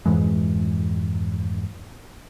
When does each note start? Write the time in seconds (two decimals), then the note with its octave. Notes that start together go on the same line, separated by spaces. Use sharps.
0.06 F2 G#2 E3 G#3